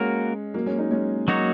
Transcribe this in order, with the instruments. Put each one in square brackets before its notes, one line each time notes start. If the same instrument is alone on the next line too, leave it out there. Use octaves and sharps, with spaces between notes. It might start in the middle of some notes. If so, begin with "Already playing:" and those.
Already playing: [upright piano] G#3 C#4 [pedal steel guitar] A#3 F#4 A#4
[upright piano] F#3 A#3
G#3 C#4
A#3 D#4
G#3 C#4
[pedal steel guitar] F#3 A#3 D#4 F#4 C#5